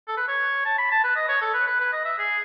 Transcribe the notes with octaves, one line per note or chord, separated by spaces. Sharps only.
A4
B4
C#5
A5
B5
A5
B4
D#5
C#5
A4
B4
B4
B4
D#5
E5
G#4